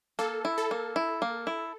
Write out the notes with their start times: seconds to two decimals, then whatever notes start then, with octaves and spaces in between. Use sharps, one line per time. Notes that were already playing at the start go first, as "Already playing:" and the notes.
0.19 A#3 A4
0.45 E4
0.58 A4
0.71 A#3
0.96 E4
1.22 A#3
1.47 E4